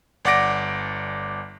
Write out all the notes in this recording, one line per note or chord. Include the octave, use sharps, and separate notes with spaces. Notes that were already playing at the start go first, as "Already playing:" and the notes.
G1 D5 F#5 D6 A#6 D7